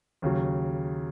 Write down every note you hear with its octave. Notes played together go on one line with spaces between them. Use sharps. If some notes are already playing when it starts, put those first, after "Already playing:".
D#2 C#3 F#3